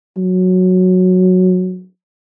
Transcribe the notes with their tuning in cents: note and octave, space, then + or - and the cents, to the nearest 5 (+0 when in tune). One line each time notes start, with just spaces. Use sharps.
F#3 -10